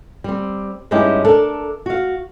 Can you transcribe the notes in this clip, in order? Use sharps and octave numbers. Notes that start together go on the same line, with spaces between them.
G3 C4
G2 G#3 C#4 D#4 E4 G4
D4 A4 A#4
F#4 F5